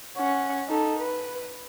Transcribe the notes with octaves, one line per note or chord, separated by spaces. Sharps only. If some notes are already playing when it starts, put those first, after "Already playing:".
C#4 F#5
D#4 A4
B4